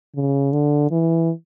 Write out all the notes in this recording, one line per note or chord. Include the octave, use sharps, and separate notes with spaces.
C#3
D3
E3